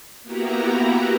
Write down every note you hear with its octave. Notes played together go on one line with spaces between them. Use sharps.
A#3 B3 E4 F#4 G4 A#5